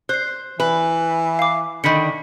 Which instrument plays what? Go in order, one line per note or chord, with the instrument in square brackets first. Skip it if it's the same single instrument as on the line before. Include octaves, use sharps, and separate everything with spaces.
[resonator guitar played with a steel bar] C5 [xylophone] F#6 C7
[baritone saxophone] E3 [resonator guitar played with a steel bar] B4
[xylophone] F5 D6
[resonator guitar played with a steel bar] D3 D#3 [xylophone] B5 B6 C#7